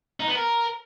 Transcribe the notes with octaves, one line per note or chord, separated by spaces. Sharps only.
D#4
B3
A#4